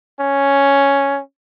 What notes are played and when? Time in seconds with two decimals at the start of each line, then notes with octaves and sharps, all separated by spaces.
0.21 C#4